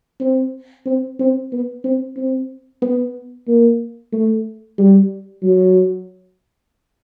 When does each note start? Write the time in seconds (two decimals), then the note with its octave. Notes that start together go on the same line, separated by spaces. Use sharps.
0.21 C4
0.86 C4
1.19 C4
1.52 B3
1.84 C4
2.17 C4
2.82 B3
3.48 A#3
4.13 A3
4.78 G3
5.43 F#3